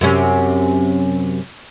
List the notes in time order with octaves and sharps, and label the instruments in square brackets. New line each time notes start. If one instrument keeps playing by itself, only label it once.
[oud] F#2 C3 C#4